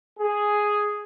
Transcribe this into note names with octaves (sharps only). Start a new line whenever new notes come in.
G#4